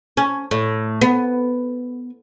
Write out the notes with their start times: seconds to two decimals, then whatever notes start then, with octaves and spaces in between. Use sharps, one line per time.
0.17 C#4
0.51 A2
1.01 B3